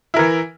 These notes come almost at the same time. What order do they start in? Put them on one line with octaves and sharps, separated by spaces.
E4 A#4 E3